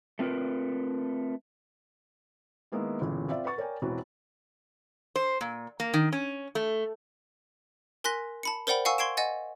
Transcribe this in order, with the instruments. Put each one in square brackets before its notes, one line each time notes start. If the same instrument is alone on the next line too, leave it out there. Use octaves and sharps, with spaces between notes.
[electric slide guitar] A3 C4 F4 A#4 B4
[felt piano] D#3 G#3 A#3 B3 E4
G1 A#2 C#3 E3
C4 F4 D5 E5
B4 F#5 C#6 A6
A#4 C#5 D5 G5 G#5
E1 E3 C4 F#4
[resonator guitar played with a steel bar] C5
A#2
A#3
D#3
C#4
A3
[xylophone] A#4 G#5 C6 F#6 A#6 B6
A5 B5 C#7
A#4 C5 D5 F#5 G5 B5
F5 F#5 G#5 C#6 E6
C6 C#6 G#6 C7 D7 E7
D#5 F#5 G#5 A6